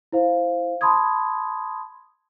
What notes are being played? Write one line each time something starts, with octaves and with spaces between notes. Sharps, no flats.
E4 C5 F5
A5 B5 C6 D#6 G#6